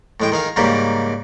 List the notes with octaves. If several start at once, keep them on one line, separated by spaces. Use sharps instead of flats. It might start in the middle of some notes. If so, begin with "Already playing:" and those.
A2 G#3 G5
D#3 G#4 F5
G#2 C#3 G3 A#3 G4